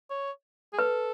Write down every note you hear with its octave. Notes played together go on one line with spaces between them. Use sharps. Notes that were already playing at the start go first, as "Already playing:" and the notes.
C#5
G#4
A4 B4